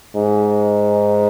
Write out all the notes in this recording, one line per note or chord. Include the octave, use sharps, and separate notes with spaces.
G#2